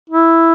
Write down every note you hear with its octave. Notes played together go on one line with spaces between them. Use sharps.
E4